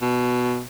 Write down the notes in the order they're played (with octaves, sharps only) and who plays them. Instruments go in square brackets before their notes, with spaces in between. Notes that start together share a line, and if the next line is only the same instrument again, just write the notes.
[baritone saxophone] B2